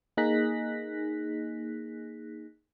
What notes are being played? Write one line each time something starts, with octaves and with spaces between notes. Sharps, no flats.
A#3 D#4 G#4 F#6 A#6 B6